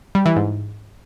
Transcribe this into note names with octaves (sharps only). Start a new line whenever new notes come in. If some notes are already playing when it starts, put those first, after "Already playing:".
G3
E3
G#2